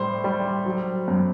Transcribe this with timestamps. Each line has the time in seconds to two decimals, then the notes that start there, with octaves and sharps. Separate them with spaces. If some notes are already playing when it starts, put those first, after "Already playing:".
Already playing: A2 G3 C5
0.24 G3
0.66 F#3
1.08 F#2